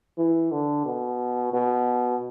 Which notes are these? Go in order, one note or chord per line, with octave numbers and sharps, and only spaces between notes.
E3
D3
B2
B2